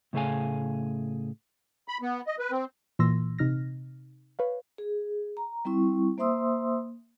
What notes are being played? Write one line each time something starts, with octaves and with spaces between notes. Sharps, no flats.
A2 C#3 A3 G#4 F5 G#5
B5
B3
D#5
B4
C4
A#2 E3 C6 E6 A#6
C3 D#4 F6 A#6
B4 C#5 F5
G#4
A#5
G3 C4 E4 C#6
A#3 C5 E5 C6 D#6 E6